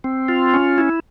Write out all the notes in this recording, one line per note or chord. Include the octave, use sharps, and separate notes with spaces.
C4
F4
C#4
E4